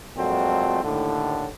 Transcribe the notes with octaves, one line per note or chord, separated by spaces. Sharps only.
F2 A#2 F#3 G#3 A3 C4
D#2 A2 D3